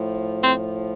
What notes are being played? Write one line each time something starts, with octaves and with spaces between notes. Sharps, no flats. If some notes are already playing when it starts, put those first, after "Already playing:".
Already playing: A2 F3
C4